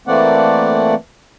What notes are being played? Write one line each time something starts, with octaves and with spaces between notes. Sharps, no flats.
E3 A3 A#3 C4 D5 F#5